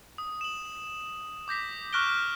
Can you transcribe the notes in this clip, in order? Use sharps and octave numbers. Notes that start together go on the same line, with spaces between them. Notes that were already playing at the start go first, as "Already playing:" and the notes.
D#6
E7 F#7
D6 G6 A#6 B6
C#6 F6 F#6 A#6 D7 G7